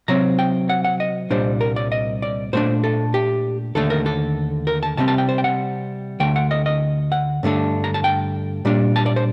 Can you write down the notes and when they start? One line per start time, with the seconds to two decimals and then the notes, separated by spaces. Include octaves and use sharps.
0.08 C3 F#3 C4 A#5
0.39 G5
0.69 F#5
0.84 F#5
1.00 D#5
1.30 C2 A#2 G3 D4 C5
1.61 A#4
1.76 D5
1.92 D#5
2.22 D5
2.53 A#2 A3 D4 C5
2.84 A4
3.14 G4
3.75 D#2 D3 A3 A4
3.90 A#4
4.06 A4
4.67 A#4
4.83 A5
4.97 C3 G3 C4 A5
5.08 A5
5.18 G5
5.29 C5
5.38 G5
5.44 F#5
6.20 D2 D3 A3 G5
6.36 F#5
6.51 D#5
6.66 D#5
7.12 F#5
7.43 G2 D3 A3 D4
7.84 A#5
7.94 A5
8.04 G5
8.65 A#2 G3 D4
8.96 A5
9.06 D5
9.16 C5